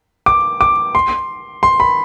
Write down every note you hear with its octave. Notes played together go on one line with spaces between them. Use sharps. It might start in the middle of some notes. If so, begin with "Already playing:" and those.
D6
D6
C6
C6
B5